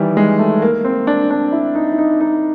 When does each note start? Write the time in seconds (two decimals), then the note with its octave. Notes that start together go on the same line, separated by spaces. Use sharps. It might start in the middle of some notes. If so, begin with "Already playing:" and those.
Already playing: D#3 E3 G3
0.17 G#3
0.39 A3
0.62 A#3
0.85 C4
1.07 D4
1.30 D4
1.52 E4
1.75 D#4
1.92 E4
1.98 D#4
2.20 D#4